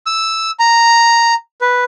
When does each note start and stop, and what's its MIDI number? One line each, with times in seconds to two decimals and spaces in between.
0.06 0.51 88
0.59 1.34 82
1.61 1.84 71